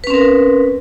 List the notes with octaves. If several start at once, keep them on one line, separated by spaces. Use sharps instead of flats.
C4 C#4 A#4 B4